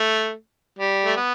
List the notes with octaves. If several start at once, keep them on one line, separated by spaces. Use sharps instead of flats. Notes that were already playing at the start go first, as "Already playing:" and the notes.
Already playing: A3
G3
A3
B3